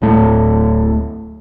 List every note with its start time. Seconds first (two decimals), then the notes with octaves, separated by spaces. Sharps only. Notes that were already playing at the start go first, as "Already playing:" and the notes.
0.02 D1 A2 A3